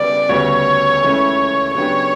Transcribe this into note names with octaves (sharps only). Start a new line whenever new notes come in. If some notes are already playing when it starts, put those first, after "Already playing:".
Already playing: C#3 G3 B3 E4 B4 D5
D2 C#3 G3 B3 F#4 C#5
C#2 C#3 E3 A3 C#4
C#3 F#3 B3 D4 G4 C#5